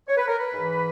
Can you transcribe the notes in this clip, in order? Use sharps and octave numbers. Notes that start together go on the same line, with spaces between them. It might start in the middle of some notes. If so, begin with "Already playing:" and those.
C#5
B4
A#4
B4
G#2
E3